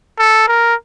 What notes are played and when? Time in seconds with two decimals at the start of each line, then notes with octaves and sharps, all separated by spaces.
0.19 A4
0.48 A#4